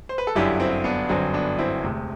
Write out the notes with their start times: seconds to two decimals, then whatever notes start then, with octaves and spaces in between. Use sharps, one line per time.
0.09 C5
0.18 B4
0.27 A4
0.35 G1 F#2 D3 F#3 E4 G4
0.60 C4 E4
0.84 B3 D4
1.09 G1 F#2 D3 F#3 C4
1.34 B3 D4
1.58 C4 E4
1.83 E1 D2 C3